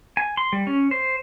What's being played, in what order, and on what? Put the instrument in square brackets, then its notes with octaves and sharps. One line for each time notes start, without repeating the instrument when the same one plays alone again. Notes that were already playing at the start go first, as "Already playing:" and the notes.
[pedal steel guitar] G#5
C6
G3
C#4
C5